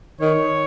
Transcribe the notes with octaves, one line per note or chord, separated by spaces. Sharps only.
D#3 C#5